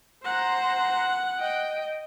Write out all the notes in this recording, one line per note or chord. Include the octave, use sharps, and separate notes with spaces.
C5 F#5 A#5
D#5 G5